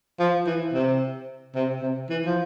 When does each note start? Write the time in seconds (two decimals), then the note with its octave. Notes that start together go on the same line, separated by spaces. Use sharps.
0.20 F3
0.47 E3
0.74 C3
1.55 C3
1.83 C3
2.10 E3
2.26 F3